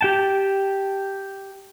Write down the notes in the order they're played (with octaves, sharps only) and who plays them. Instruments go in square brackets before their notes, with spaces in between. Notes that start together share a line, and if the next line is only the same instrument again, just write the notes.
[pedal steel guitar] G4 G5 A5